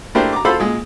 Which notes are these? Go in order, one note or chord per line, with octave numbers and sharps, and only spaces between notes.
A3 D4 E4 G4 A#4 C5
A#5 D6
F4 A4 C5 F5 B5 E6
A#2 G#3